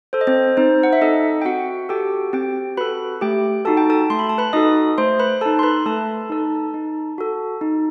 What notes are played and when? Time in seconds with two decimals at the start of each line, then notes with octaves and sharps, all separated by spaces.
0.13 A4 C5
0.21 D#5
0.27 C4 C5
0.57 C4 D#4 C5
0.83 F#5
0.93 E5
1.01 D#4 A4 D#5
1.42 G5
1.45 C4 F#4 F#5
1.89 F#4 G4 A4 G5
2.33 C4 G4 G5
2.77 F#4 A4 B4 B5
3.21 A3 G4 G5
3.65 D#4 F#4 A4 A5
3.77 G5
3.90 A4 A5
4.10 A3 C6
4.19 B5
4.29 A5
4.38 B4 B5
4.53 D#4 F#4 A4 D#5 D#6
4.98 A3 C5 C6
5.20 B4 B5
5.41 D#4 A4 A5
5.59 C6
5.63 B4 B5
5.85 A3 A4 A5
6.30 D#4 A4
6.74 D#4
7.18 F#4 A4
7.61 D#4